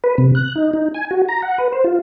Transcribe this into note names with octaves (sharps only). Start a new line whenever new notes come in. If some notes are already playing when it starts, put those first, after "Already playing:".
B4
C3
F#6
D#4
D#4
G#5
F#4
A#5
F#5
B4
C5
F4